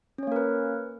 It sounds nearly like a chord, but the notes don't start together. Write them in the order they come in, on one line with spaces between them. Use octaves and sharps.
C#4 C#5 A#3 A#4 B4